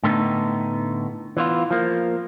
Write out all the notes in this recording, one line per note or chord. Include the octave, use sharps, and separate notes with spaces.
A2 D3 A3 B3 D#4
E3 B3 F4
F3 A#3